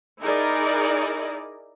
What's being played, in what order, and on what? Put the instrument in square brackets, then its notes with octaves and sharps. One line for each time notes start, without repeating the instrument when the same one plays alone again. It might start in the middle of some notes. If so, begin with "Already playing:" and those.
[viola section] D#4 E4 G#4 A#4 D5 D#5